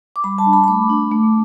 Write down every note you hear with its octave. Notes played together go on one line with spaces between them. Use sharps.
D6
G3 B5
A5
D4
B5
B5
A3 D6
D4
A3